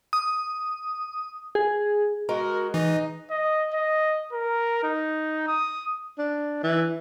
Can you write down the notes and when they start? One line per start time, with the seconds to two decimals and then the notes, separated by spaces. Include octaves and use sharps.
0.13 D#6
1.55 G#4
2.29 G#3 F#4 A#4
2.74 E3 D#4 D#5
3.30 D#5
3.74 D#5
4.33 A#4
4.84 D#4
5.48 D#6
6.18 D4
6.63 E3